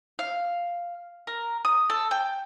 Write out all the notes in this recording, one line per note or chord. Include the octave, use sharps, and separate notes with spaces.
F5
A#4
D#6
A4
G5